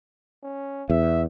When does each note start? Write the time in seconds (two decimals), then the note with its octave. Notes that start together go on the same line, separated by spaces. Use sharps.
0.43 C#4
0.90 E2 E5